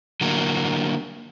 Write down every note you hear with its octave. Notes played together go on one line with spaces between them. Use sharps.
D3 F#3 A#3